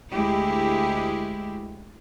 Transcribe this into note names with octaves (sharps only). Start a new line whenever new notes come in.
D2 G#3 E4 G4